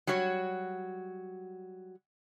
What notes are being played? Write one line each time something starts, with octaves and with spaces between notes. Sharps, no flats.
F#3 G3 F#4 C#5